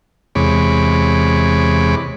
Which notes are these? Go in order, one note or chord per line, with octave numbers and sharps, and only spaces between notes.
E2 C3 G#3 C#5 B5 D6